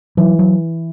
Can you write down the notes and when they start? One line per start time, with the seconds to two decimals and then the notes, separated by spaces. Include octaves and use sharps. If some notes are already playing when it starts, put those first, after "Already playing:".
0.17 E3 F#3
0.39 F#3